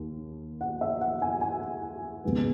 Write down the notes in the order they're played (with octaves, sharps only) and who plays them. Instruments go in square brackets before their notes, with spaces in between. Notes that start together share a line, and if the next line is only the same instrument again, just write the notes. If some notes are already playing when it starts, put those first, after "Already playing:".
Already playing: [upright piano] D#2
F#5
E5
F#5
G#5
G#5
D#2 C#3 G#3 B3